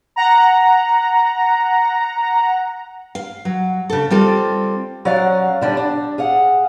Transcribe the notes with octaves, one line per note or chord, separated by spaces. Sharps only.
F#5 A#5
F5
F#3
C#3 A4
G3 C4 F4 A4
F#3 C#4 D5 F5 F#5
D3 G3 D4
D4
G#4 F5 F#5